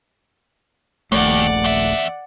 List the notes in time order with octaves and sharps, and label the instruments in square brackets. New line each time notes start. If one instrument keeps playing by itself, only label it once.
[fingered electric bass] D#1 A#1 A3 [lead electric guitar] D#2 [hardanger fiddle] D5 F#5
[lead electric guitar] E2 E5